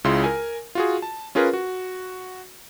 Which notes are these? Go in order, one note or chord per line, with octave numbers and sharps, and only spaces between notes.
C#2 C#3 E4 F4 C6
A#4 G#5
F4 F#4 G#4
A5
C#4 F4 G#4 A#4 B4
F#4